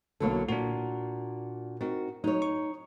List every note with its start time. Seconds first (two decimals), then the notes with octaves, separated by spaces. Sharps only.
0.20 B1 B2 D3 F#3 A#3 A4
0.48 A#2 D4 F#4
1.81 C4 D#4 F#4 A#4
2.24 F#3 D#4 C#5
2.42 C#6